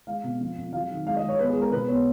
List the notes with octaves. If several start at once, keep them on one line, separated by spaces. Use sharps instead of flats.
G#3 F5
B2
F3
F2
F#3 F5
D#3
G#3 F5
D#5
G#3
C#5
B3 B4
G#4
G#3
A#4
B2 B4
B3 C#5